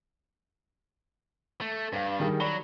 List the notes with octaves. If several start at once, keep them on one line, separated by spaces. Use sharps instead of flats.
A3
G2 B4 F5
D#3 G3 G#4
F#3 D5 B5 G7